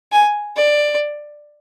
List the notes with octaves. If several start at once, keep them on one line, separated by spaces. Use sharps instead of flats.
G#5
D5